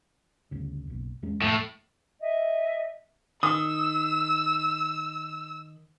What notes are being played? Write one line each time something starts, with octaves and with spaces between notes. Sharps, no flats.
G1 D2 C#3
F#1 B1
E2 G#3 C#4
E1 F2 A2 A3
D#5 E5
D#3 D#6 E6